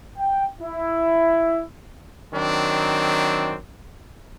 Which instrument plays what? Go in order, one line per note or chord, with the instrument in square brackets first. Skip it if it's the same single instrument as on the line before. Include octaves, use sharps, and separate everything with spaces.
[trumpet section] G5
E4
[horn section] D#3 F#3 C4 D4